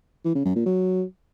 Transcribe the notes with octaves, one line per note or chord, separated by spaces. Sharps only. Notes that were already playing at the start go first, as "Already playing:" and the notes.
E3
C#3
F#2
A#2
F#3